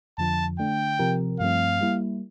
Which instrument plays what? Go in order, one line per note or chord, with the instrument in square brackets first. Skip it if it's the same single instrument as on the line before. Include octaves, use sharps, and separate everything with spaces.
[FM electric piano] F2 D3 F3 [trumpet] A5
[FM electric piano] D3 A3 D4 [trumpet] G5
[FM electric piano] C3 F3 C4 G4 A#4
[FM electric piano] G2 F3 A3 C4 [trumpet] F5
[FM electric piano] G3 A#3 E4